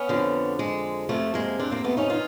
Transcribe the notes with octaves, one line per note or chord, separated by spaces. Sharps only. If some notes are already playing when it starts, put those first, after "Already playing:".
Already playing: B3 C#4
F2 D3 F3
G#3
F2 C3 F3 A3
G#3 A#3
C4 D4
A#3 C4
A3 B3
C#4 D#4
E3 D#4 F4